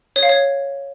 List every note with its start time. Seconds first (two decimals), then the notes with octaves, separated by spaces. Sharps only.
0.16 C#5
0.23 F5
0.29 C#5